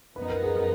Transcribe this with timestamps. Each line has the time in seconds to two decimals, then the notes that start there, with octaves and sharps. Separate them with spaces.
0.16 F#2 F3 B3 D#4 B4
0.30 A#4
0.43 G#4
0.56 A#4